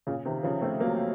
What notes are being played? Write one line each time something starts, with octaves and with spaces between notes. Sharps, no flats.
A#2 C#3
C3 D#3
C#3 F3
A3 C4
F#3 A#3